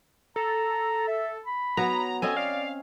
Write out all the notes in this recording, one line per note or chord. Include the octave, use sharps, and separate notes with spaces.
A4 A#5
E5
B5
F#3 B3 A#5
C4 C#4 A4 D#5 G#5
D5 F5